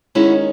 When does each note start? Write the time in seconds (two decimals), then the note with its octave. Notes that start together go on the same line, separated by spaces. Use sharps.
0.15 D#2 D#3 G#3 C#4 E4 F#4